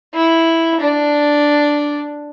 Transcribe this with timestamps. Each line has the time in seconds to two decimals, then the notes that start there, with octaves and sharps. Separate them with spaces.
0.14 E4
0.80 D4